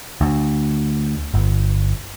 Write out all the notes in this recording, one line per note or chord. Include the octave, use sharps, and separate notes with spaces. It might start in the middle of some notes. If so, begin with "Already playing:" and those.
D2
G1